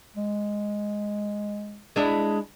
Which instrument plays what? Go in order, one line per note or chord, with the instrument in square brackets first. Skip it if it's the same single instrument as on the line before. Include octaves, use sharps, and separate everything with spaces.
[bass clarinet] G#3
[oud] G#3 D4 E4